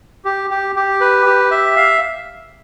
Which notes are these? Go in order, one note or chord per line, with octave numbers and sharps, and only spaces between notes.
G4
G4
G4
B4
G4
E5
F5